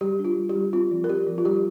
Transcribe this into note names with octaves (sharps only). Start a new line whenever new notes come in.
G3 G4
D4
F4
G3
G4
G3
C4 F4
F3
A#4
C4 G4
F3
F4
G3 G4